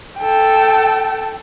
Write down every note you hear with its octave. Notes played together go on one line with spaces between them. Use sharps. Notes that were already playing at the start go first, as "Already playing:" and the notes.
A4 G5